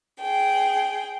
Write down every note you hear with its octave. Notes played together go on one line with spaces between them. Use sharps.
G#4 G5